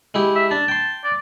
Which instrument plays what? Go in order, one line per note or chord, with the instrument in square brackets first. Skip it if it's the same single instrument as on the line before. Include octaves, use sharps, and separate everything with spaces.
[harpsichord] G#3 E4 G4
[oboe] E5
[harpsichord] D4 [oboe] A5
[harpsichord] G5 C6
[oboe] D5